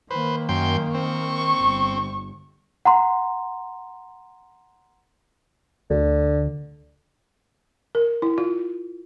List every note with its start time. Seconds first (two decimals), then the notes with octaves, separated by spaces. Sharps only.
0.11 D#3 A#3 B4 C5
0.49 F#2 G5 C6
0.94 C4 C#6
1.59 G1
2.85 F#5 A#5 C6
5.90 D2 D3
7.95 A#4
8.22 E4
8.38 F4